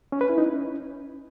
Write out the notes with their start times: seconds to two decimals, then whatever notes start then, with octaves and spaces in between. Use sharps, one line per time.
0.12 C#4
0.21 B4
0.29 E4
0.38 D#4
0.46 C#4